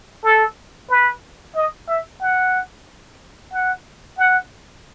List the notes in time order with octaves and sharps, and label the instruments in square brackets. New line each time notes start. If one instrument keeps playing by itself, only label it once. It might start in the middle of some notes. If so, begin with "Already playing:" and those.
[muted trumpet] A4
B4
D#5
E5
F#5
F#5
F#5